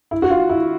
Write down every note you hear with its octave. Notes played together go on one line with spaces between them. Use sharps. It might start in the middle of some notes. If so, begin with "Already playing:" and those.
E4
F#4
F4
E4